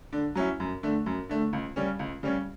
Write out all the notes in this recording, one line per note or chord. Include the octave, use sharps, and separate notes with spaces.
D3
F#3 C#4 E4
F#2
D3 A3
F#2
D3 A3
C#2
C#3 G3 C#4
C#2
C#3 G3 C#4